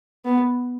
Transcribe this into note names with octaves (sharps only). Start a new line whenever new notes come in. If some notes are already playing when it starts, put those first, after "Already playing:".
B3